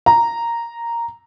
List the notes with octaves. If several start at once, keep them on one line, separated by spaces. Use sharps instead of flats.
A#5